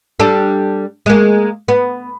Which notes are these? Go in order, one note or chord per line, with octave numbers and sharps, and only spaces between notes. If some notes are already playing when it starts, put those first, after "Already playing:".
G3 D4 A4
G#3 A#3
B3